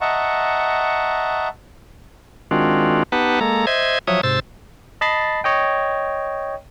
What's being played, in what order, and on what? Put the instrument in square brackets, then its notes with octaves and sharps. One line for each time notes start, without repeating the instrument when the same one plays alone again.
[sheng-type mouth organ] D#5 E5 F#5 A5 A#5 C#6
[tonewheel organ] D#3 G#3 C4 D4 F4 F#4
B3 D#4 G4 B4 F#5 A5
G#3 A#3 A4 A#5
C5 D#5 E5 G#6
F3 F#3 C#5 E5 D#6
G#2 C3 C5 E6 A6
[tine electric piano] D#5 A5 B5 A6 C7
C#5 D#5 G5